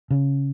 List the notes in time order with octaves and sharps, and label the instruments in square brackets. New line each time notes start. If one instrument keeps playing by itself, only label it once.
[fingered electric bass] C#3